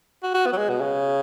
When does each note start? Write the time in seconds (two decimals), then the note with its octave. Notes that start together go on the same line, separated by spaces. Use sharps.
0.23 F#4
0.34 F#4
0.46 B3
0.53 F#3
0.58 G#3
0.69 B2
0.81 C#3